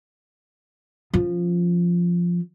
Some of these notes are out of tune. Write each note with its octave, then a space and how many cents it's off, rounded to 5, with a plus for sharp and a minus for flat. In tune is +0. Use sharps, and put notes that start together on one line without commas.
F3 +0 C#4 +0